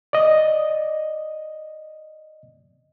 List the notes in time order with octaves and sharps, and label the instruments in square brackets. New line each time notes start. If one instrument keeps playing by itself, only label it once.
[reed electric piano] D5 D#5